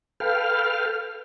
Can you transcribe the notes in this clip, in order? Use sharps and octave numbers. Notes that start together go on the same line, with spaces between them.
A4 B4 F5 G5 F6